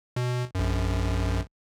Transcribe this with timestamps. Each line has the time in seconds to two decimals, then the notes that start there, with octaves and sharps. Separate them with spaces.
0.16 B2
0.55 A#1 F#2